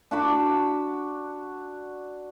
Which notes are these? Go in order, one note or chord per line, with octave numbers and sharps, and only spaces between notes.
D4 F#4 B5 D6